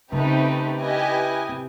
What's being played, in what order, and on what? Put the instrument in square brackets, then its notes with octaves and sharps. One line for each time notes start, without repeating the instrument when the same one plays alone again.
[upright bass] C#3 [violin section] A3 C4 D#4 G4 B4
[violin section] E4 G4 B4 D#5 G#5
[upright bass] C3